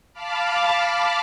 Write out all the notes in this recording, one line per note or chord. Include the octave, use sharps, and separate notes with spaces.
F5 A5 B5 D6 F6